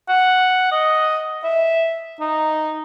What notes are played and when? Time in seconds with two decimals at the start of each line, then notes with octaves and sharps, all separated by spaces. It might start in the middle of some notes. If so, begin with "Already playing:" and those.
0.09 F#5
0.72 D#5
1.44 E5
2.21 D#4